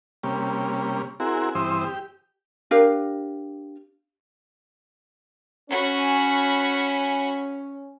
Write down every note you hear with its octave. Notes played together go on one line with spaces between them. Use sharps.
C3 G3 A#3 C#4
C4 E4 F#4 G#4 A#4
G2 E3 C4 C5 D#6 E6
G4
D4 G4 A#4 F5
C#4 F#4 B5